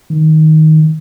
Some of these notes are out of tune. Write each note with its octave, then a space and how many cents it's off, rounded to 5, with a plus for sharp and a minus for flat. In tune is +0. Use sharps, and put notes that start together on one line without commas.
D#3 +10